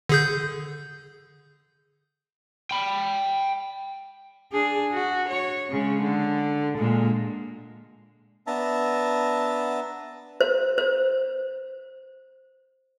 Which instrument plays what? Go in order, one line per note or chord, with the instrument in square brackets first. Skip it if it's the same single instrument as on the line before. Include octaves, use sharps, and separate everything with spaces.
[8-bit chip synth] D3 G#4 G6
[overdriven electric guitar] G5 B5
[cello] D4 G#4
F#4
C#5
C#3 G#3
D3
A#2 G#3
[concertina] B3 D4 E5 A5 A#5
[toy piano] C5
C5